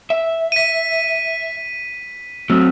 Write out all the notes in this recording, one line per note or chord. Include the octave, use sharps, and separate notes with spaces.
E5
B6 D#7
F#3 A3 C4 E6